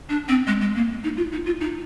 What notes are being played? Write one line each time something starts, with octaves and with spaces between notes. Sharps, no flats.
D4
C4
G#3
G#3
A#3
D#4
F4
D#4
F4
D#4